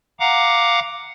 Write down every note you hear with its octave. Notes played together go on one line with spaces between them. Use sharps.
F5 F#5 A#5 D6